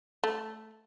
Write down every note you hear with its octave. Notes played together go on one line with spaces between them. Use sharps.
A3